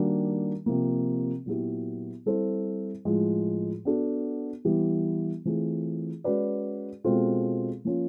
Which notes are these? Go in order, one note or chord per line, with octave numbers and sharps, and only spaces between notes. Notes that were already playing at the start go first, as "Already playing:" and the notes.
Already playing: D#3 G3 A#3 D4 F#4
C3 F3 A#3
A#2 F#3 B3 E4 G4
G3 C4 E4 A4 C5
A2 F3 G#3
B3 D4 F#4 A4
E3 G3 B3 E4 G4
E3 A3 C4 F4 G#4
G#3 C#4 F#4 B4 D5
B2 G#3 C4 F4 A4
F3 A#3 C#4 F4